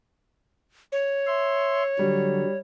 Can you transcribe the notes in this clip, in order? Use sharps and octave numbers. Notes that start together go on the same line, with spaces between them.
C#5
E5 C6
D3 F#3 G3